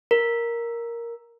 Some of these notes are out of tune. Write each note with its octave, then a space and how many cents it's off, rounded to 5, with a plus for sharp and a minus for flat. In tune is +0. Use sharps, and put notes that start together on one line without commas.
A#4 +5